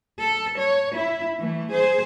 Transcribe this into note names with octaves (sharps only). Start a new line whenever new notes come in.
A4
C#5
E4
E3 A3
G#4 C5